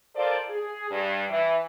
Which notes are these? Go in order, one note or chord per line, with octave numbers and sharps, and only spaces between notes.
F4 A4 A#4 C5 D5
G#4
G2
E3